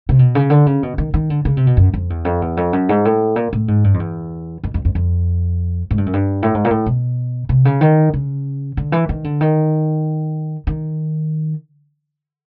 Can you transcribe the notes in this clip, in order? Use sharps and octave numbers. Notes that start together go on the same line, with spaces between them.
C3
B2
C#3
D3
C#3
B2
D#3
D#3
D3
C#3
C3
B2
F#2
F2
E2
F2
E2
F2
F#2
G#2
A2
A#2
A2
G#2
G2
F2
E2
F2
F2
F2
F2
G#2
G2
F#2
G2
A2
G#2
A#2
A2
B2
C3
C#3
D#3
C#3
D3
E3
D#3
D3
D#3
D#3